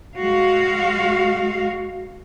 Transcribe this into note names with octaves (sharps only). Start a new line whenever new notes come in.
G#3 F#4 F5